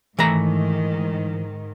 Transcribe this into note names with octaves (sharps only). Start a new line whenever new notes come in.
G#2 D#3 E3 A3 A#5